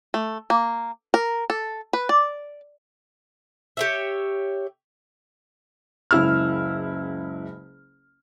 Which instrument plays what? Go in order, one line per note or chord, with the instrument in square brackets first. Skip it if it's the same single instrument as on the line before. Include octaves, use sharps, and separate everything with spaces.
[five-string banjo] A3
A#3
A#4
A4
B4
D5
[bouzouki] G4 C#5 E5
[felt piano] F#1 C#2 E4 E6 F6